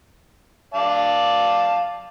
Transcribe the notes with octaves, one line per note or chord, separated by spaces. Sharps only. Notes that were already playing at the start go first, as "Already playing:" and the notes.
D5 F5 A5